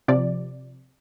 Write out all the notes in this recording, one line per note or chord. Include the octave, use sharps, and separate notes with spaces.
C3 F3 D5